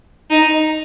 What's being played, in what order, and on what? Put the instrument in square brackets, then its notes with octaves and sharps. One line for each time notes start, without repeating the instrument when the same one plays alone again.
[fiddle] D#4